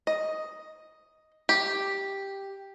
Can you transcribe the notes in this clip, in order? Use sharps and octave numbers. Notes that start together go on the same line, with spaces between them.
D#5
G4